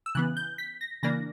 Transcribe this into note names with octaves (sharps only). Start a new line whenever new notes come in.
E6
C#3 E3 B3 F#6
G6
B6
A#6
C#3 E3 A#3 D4 A#6